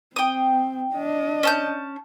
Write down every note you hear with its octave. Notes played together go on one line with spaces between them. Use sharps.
C4 G5 D#6
D4 D#5
C#4 A5 G6